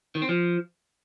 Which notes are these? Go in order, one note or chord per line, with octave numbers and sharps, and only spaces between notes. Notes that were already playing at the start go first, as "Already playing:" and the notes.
D#3
C4
F3